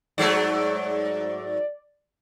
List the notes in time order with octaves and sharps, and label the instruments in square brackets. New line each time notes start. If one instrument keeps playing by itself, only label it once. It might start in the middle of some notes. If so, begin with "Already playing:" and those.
[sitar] G#2 F#3 A3 [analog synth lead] D5